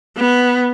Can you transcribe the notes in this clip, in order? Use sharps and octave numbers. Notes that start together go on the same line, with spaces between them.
B3